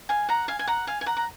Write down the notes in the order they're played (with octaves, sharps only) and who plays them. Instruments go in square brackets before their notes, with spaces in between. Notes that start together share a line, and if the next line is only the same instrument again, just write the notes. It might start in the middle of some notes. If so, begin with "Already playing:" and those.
[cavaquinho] F5 G#5
F#5 A#5
F5 G#5
G#5
F#5 A#5
F5 G#5
G#5
F#5 A#5
A#5